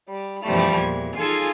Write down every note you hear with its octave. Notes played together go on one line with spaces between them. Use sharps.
G3
F#2 B2 E3 F3 G3 A3
E2 A#2 G#6
D#4 F4 G#4 A4 F5 G#5